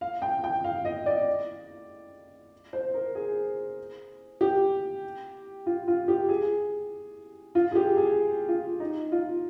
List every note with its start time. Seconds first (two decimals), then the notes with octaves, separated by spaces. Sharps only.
0.01 F5
0.22 G5
0.44 G5
0.64 F5
0.85 D#5
1.06 D5
2.73 C5
2.94 A#4
3.15 G#4
4.41 G4
5.66 F4
5.88 F4
6.08 G4
6.29 G#4
7.55 F4
7.71 G#4
7.75 G4
7.97 G#4
8.49 F4
8.80 D#4
9.12 F4